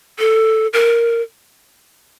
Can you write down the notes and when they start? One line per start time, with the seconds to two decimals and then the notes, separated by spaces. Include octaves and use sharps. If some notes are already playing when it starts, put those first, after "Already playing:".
0.19 A4
0.73 A#4